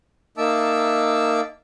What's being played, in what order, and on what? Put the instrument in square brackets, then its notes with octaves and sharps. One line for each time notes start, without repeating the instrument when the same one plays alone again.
[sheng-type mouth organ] A#3 D#4 E5 A5 D6 E6